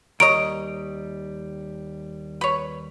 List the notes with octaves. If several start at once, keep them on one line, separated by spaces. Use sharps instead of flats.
D#2 G3 A#4 C#5 D#5 D7
B4 C#5